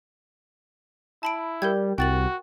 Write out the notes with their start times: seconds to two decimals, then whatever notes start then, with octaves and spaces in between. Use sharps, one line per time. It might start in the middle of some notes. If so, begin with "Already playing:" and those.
1.23 E4 A5 B5 D7
1.62 G3 A#4 G6 G#6
1.98 C2 F#4 G5 A6 F#7